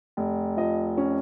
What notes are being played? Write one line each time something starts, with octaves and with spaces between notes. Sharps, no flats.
F1
F3 D#5
C#4